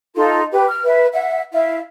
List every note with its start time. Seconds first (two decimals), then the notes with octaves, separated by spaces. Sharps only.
0.15 D#4 F4 A4 C6
0.52 G4 B4
0.68 F6
0.84 B4 E5
1.13 E5 F#5
1.52 E4 E5 F5